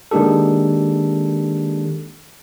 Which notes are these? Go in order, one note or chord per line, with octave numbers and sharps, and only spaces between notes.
D#3 G#3 A#3 D4 G4 A4